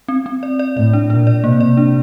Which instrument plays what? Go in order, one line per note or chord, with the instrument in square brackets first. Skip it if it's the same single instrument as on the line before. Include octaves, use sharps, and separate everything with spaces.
[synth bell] C4
C4
D5
D5
[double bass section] A2 [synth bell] D5
[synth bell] D4
[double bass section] A#2 [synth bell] D4
[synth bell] D5
[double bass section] C3 [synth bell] A#3
[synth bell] D5
D4